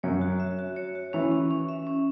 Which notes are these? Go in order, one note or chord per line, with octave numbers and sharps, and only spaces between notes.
F#2 C#5
F#4
E5
F#4
C#5
F#4
E3 C#4
C#4
C#4
E5
C#4